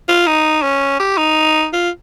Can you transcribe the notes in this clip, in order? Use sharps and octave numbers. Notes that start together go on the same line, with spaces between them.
F4
D#4
C#4
G4
D#4
F4